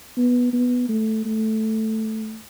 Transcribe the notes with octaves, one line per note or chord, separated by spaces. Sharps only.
B3
B3
A3
A3